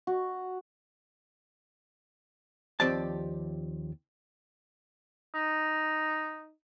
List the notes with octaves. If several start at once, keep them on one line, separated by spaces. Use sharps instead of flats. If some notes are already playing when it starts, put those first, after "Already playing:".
F#4
D#2 F3 C4 G4 D5 A5
D#4